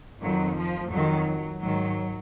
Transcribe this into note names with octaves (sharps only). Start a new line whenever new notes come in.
F2 D#3 F#3
F3
F2 D#3 F#3
G#2 D#3 F#3